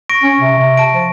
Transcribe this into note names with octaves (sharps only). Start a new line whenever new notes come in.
C#6 A#6 D7
C#4
C3
C3
A5 D7
F3